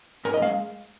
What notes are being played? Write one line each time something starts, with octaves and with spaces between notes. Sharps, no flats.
G#2 A#4
D#5
G#3 F5